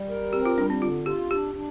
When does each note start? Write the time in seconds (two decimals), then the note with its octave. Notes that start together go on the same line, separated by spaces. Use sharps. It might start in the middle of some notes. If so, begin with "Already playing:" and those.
Already playing: G3
0.09 A#4
0.33 C4 G4
0.46 F4
0.58 G3 D4
0.70 C4
0.82 D3 F4
1.06 F4 G4
1.31 D4 G4
1.55 D4